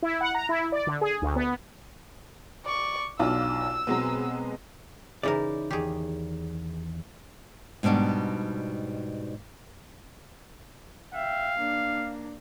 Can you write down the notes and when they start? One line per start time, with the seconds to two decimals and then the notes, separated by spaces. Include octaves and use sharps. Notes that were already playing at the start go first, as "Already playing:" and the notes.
0.02 E4
0.21 F#5
0.35 A#5
0.49 E4
0.72 D5
0.87 D3
1.01 G#4
1.22 D2
1.36 B3
2.65 D5 C#6
3.19 B1 D4 F4 E6
3.87 B2 F#3 G#3 B3 C4
5.23 C#3 E3 D#4 E4 A#4 D5
5.71 E2 D#3 G4 G#4
7.83 G#2 B2 G3 D4 D#4
11.14 E5 F5 G5
11.58 A#3 D4